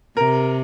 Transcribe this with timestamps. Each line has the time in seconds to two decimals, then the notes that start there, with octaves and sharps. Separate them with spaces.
0.17 C3 A#4